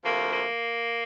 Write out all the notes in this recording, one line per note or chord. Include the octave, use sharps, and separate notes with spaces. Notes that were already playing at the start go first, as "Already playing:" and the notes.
D2 C3 F3 A#3
A#3